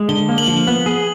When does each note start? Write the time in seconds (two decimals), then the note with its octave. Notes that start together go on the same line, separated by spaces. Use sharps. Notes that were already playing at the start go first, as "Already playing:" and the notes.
Already playing: G#3
0.09 D3 G7
0.29 A#3
0.38 F#7
0.47 F3
0.67 B3
0.86 G#4